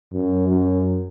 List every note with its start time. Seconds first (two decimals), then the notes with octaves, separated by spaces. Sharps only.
0.13 F#2
0.48 F#2